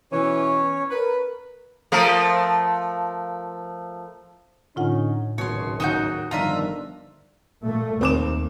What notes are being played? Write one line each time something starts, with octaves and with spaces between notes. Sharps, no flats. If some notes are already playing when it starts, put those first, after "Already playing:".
B2 E3 C#4 C#5
A#4 B4
F3 A3 A#4
A2 D3 C#4 D#4 F4 F#5
G#1 C#2 F#2 B2 C#5 C6
D#2 D#4 F#4 C#6 G6
G1 D#3 F3 D4 F4 D#5 E5 A#5
A#2 A3
D#2 C4 D6 E7